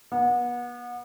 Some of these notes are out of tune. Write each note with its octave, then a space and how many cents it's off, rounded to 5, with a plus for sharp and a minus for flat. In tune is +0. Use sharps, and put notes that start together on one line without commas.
B3 -30